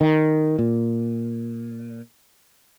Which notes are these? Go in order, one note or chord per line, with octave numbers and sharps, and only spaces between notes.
D#3
A#2